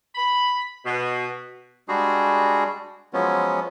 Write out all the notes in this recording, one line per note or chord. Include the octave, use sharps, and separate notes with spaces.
B5
B2
G3 G#3 D4 F#4 G#4
F3 F#3 G#3 B3 C#4